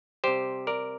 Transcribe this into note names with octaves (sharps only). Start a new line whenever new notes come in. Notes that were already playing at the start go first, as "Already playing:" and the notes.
C3 G3 G4 C5
A#4 D5